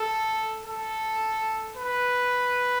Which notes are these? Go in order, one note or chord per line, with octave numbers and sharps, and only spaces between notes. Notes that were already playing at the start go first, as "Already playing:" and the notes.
Already playing: A4
A4
B4